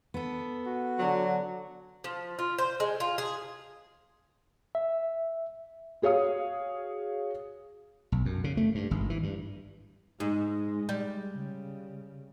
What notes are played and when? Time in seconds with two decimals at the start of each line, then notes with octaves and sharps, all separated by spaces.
0.14 B3 A4
0.66 F#4
0.99 D3 F#3
2.04 F3
2.39 F4
2.58 C5
2.80 G#3
3.00 F4
3.18 G#4
4.75 E5
6.02 F#4 G#4 C#5 F5 D#6
8.12 B1
8.25 F#2
8.44 C#3
8.57 A3
8.75 G2
8.91 G#1
9.10 E3
9.23 G2
10.20 G#2 G#3
10.89 G3
11.35 C#3